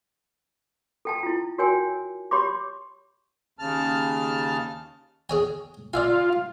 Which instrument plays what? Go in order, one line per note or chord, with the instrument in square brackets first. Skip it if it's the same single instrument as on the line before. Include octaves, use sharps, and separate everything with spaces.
[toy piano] A4 G5 A5
E4 F4
F#4 A#4 C#5 G5 G#5
G4 C#5 B5 C6 D6
[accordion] D#2 C#3 A5 F6
[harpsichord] G#4 C#5 G#5
[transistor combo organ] F4 [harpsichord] D5 E5 G#5